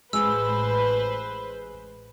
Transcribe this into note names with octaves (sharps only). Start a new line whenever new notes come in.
A1 G#3 B4 C5 E6